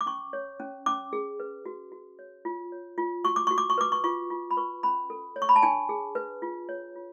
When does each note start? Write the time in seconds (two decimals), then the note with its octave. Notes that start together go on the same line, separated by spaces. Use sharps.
0.01 D6
0.06 C#4 C#6
0.33 C#5
0.60 C#4
0.86 C#4 D6
1.13 G#4
1.40 B4
1.66 F#4
1.92 F#4
2.19 C#5
2.45 F4
2.72 C#5
2.98 F4
3.24 F#4 C#6
3.36 D6
3.47 F#4 C#6
3.58 D6
3.70 C#6
3.78 B4 D6
3.92 C#6
4.04 F4 C#6
4.30 F4
4.51 B5
4.57 B4 C#6
4.83 C#4 B5
5.10 A4
5.36 C#5
5.42 C#6
5.49 B5
5.56 A5
5.63 D4 G#5
5.89 G#4
6.15 B4
6.42 F4
6.69 C#5
6.96 F4